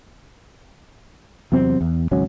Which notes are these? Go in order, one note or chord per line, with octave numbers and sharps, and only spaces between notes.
E2 C3 F#3 C4
E2
G#1 C#2 F#3 C#4